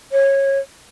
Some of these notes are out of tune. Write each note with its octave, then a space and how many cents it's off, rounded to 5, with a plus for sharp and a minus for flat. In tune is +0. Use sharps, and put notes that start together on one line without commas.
C#5 -20